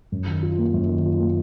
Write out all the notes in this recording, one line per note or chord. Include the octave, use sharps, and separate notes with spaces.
F#2
D#3
F4
A#3
F#2
D#3
F4
A#3